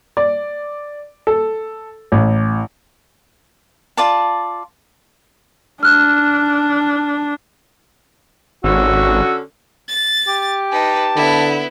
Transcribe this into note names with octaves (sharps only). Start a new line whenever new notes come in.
D5
A4
A1
F4 D5 A5
D4 F6 F#6
G#1 D3 C#4 F#4 E6
A6
G4
D#4 B4 A5
D3 B3 E4